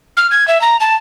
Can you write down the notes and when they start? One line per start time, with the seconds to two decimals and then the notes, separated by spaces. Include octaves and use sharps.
0.17 F6
0.31 G#6
0.48 E5
0.61 A#5
0.80 A5